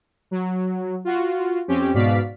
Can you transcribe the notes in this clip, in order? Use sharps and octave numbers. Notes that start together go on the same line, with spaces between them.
F#3
F4 F#4
F2 C4 C#4 G4
G#2 B2 F#4 D5 F5 B6